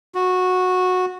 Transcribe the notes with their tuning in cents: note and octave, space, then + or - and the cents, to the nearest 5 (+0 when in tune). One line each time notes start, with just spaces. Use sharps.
F#4 -15